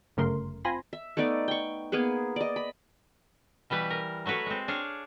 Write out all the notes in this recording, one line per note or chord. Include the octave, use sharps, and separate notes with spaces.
G1 F#2 C#3 A3 A#4 C6
C4 F4 G#5 B5 C6 A#6
E5
A3 B3 D#4 D5
G5 C#6
A#3 B3 G#4 B4
D5 D#5
B5
B2 E3 G3 B4
A#4
F#3 A3 F#4 B4 C#5
G#3 C4
D4 G#4 C#5 F5